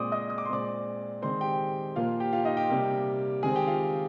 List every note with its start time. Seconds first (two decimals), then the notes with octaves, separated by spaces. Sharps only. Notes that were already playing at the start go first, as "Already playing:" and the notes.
Already playing: A#2 G#3 C4 C5 D5 C6 D6 D#6
0.12 D#5 D#6
0.30 D#6
0.38 D6
0.45 C6
0.49 A#2 G#3 C4 D5 D6
1.22 D#3 G#3 C4 C5 C6
1.41 G4 G5
1.96 A#2 F3 A#3 F4 F5
2.20 G4 G5
2.33 F4 F5
2.45 D#4 D#5
2.57 G4 G5
2.70 C3 G3 A#3
3.43 C3 D#3 G#3 C4 G#4 G#5
3.55 G4 G5
3.68 F4 F5